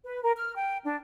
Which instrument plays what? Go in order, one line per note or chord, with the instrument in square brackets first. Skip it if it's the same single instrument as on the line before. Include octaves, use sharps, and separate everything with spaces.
[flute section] B4
A#4
F6
G5
D4